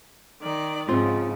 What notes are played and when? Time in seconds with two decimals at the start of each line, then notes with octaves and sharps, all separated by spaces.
0.41 D#3 D5
0.89 G#2 C#3 F3 C4 F4 C6